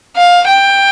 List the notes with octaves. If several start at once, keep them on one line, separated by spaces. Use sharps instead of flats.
F5
G5